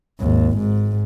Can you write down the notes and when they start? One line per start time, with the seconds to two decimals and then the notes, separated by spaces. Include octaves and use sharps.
0.20 G#1 D#2
0.59 G#2